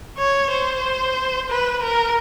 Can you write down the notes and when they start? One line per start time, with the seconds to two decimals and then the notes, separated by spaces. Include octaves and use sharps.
0.18 C#5
0.51 C5
1.50 B4
1.82 A#4